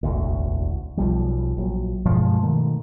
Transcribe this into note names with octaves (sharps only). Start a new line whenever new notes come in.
E1 A1 D2
B1 F3 G3
A#1 F#3
G2 B2 F3 G#3
B2 D#3 A3